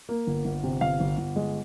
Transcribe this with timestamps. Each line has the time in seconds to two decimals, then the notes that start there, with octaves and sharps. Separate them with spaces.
0.09 A#3
0.27 G1
0.45 G1
0.64 C3
0.81 G1 F5
1.00 G1
1.18 G1
1.36 G#3